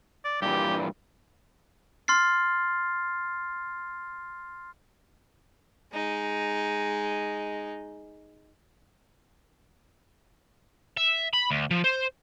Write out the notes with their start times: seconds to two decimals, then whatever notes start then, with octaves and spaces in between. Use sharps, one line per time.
0.25 D5
0.42 G2 A#2 E3 G4
2.08 C6 F6 A6 C7
5.93 G#3 D#4
10.97 E5
11.34 B5
11.51 D2
11.71 F3
11.84 C5